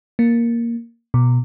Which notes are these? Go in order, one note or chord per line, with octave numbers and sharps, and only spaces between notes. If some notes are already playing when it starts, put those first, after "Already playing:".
A#3
B2